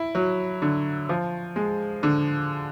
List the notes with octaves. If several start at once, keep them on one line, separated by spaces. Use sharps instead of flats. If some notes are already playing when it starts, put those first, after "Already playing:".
Already playing: E4
F#3
D3
F3
G#3
D3